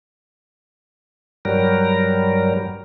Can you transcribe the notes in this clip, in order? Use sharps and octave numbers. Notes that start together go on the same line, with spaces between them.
G2 F#3 G3 A#4